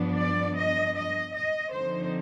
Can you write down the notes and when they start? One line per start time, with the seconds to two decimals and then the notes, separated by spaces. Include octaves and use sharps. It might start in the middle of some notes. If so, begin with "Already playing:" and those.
Already playing: G2 F3 B3 D4
0.17 D5
0.56 D#5
0.95 D#5
1.34 D#5
1.73 D3 F3 C4 D#4 C5